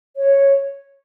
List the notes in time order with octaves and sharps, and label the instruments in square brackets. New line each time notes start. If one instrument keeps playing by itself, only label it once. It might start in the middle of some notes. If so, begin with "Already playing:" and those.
[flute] C#5